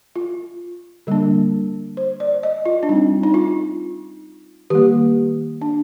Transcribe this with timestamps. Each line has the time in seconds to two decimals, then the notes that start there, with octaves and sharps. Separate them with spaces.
0.16 F4
1.07 D3 G3 A#3 D4
1.97 C5
2.20 D5
2.43 D#5
2.66 F4
2.83 D4
2.89 G3 C4 D#4
3.23 D#4
3.34 F4
4.70 D#3 G3 A#3 G4
5.62 D4